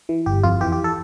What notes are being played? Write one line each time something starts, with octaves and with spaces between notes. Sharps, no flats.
E3
G1 G4
F2 F4
E3 G4
G4
A4